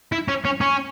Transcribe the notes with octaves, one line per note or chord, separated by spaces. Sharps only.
E4
C#4
C#4
C#4